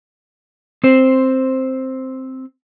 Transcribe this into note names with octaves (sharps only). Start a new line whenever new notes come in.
C4 C5